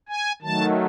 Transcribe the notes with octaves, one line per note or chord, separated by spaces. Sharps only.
G#5
D#3 F#3 A3 A5